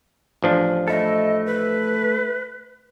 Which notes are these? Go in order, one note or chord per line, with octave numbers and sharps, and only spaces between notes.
A1 F3 D4
A3 E4 A4 D#5
B4